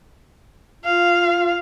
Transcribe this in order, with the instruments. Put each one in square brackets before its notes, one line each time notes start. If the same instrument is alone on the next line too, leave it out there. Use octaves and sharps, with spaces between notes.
[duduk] F4 [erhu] F5